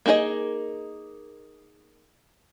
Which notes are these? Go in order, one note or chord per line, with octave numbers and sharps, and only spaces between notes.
A#3 D#4 G#4 A4 D#5